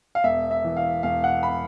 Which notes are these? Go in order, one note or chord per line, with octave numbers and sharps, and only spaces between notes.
F5
E1 E5
E5
E3
F5
E1 F5
F#5
B5